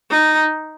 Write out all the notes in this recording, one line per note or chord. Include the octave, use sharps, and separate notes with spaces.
D#4